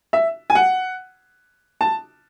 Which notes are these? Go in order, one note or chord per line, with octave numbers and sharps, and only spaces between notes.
E5
G#5
F#5
A5